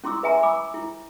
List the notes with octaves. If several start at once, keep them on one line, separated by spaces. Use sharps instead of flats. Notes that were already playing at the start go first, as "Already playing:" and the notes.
C#4 E4 C6 D6 E6
B4 E5 G#5 A#5 C6
B5 D6 E6
E4